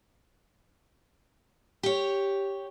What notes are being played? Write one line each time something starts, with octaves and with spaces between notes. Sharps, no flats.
G4 C#5